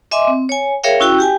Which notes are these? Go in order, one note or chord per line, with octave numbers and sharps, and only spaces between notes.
D#5 E5 G#5 C6 D6
C4
C#5 G#5
G#4 A#4 C#5 E5 F5 G5
C#4 E4 F#4 G5
G4 G5 G#5